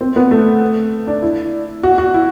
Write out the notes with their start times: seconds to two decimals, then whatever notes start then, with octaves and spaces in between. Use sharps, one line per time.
0.01 C4
0.16 B3
0.31 A3
1.07 D4
1.22 E4
1.83 F#4
1.98 F#4
2.14 E4